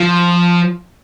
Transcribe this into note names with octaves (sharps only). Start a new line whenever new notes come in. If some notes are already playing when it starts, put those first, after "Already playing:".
Already playing: F3